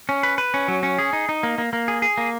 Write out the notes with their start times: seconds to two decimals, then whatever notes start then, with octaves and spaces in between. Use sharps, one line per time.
0.09 C#4
0.23 B4
0.38 B4
0.54 C#4
0.68 F#3
0.83 C#4
0.99 G#4
1.13 D#4
1.29 D#4
1.43 A#3
1.58 A#3
1.73 A#3
1.88 G#4
2.02 G#4
2.18 A#3